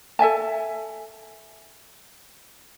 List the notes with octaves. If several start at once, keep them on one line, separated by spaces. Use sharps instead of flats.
A4 E5 G#5 A5